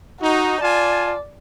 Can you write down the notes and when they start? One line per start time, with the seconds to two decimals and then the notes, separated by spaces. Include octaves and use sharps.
0.21 D#4 F#4
0.61 F4 D5 G#5 A5